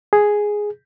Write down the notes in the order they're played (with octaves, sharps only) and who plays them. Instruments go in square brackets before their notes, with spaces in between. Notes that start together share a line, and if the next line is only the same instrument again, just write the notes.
[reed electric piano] G#4